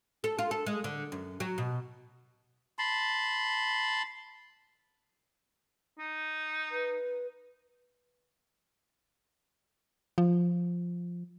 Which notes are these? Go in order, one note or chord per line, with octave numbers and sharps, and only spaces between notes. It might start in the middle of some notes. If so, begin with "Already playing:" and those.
A4
F4
A4
G#3
D3
F#2
F#3
B2
A5 B5 C6
D#4
B4
F3